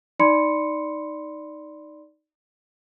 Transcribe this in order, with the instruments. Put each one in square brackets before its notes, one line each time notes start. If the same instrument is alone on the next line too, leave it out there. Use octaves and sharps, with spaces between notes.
[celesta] D#4 D5 B5 C6 C#7